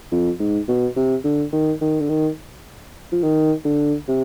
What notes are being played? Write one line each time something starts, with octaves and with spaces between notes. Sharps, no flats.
F2
G#2
B2
C3
D3
D#3
D#3
D3
D#3
F3
D#3
D3
C3